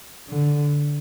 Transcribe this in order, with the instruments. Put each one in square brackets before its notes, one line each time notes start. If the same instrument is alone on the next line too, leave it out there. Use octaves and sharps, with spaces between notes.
[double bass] D3